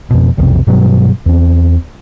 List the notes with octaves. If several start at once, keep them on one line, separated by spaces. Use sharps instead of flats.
F2 B2
B1 F2 C3
G2 B2 F#3 G3
E2 C4